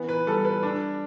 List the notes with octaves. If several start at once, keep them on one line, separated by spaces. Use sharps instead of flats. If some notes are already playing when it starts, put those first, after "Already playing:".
Already playing: E3 B3
B4
G3 A4
B4
D4